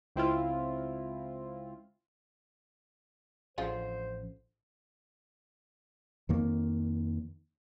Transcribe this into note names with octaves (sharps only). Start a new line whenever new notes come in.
C#2 C4 E4 F4
A1 D3 F3 C#4 F4 G#4 C5 G#5
F2 D#3 A#3